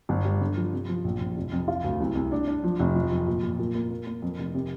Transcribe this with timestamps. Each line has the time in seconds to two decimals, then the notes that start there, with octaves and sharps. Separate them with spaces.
0.09 G1
0.25 G3
0.41 D3
0.57 F3
0.73 C3
0.89 F3
1.05 A#1
1.21 A#1
1.36 F1
1.52 F2
1.68 F4
1.84 D2
2.00 C2
2.15 C2
2.32 D4
2.47 D4
2.64 F3
2.79 F1
2.95 F3
3.11 F2
3.27 A#2
3.43 A#2
3.59 A#2
3.75 A#3
3.90 A#3
4.07 A#3
4.22 F2
4.38 F1
4.54 C3